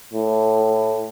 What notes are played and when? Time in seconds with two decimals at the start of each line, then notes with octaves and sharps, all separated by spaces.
0.14 A2